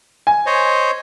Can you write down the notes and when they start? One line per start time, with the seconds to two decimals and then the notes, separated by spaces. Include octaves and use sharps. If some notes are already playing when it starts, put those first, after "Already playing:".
0.27 G#5
0.46 C5 C#5 D#5